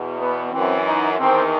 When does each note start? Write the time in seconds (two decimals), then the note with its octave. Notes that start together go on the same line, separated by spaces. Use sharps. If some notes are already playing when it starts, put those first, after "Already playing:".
Already playing: E2 B2
0.17 B3
0.51 F#2 E3 C4
0.85 D#4
1.18 E2 D#3 C4